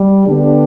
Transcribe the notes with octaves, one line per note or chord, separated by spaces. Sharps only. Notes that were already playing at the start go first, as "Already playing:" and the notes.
Already playing: G3
D3 B3 D4 G4